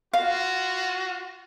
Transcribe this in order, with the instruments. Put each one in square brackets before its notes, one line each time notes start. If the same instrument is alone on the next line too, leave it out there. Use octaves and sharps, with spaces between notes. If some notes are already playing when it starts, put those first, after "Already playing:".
[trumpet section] F4 F#4 [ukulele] F5